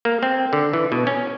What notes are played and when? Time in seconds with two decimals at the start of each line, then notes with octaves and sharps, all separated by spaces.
0.05 A#3
0.23 C4
0.53 D3
0.73 E3
0.92 B2
1.07 C#4